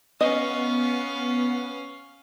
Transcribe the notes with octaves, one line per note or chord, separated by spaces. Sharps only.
B3 C#4 D#5 F5